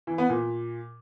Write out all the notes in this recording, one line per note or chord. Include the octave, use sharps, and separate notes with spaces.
E3
B3
A#2